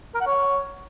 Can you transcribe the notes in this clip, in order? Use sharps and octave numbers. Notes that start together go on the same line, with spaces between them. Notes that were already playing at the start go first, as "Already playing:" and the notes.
A#4
F#5
C#5